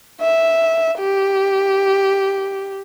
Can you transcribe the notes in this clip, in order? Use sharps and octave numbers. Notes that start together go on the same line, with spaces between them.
E5
G4